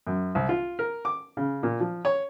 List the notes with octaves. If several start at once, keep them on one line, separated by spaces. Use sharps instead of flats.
F#2
C2
F4
A#4
D6
C#3
A#2
F3
C#5